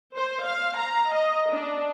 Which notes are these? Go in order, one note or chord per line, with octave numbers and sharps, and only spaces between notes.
C5
F5
A#5
D#5
D4